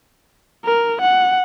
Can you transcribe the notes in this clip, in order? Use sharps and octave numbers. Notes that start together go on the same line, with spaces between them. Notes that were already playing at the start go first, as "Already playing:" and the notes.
A#4
F#5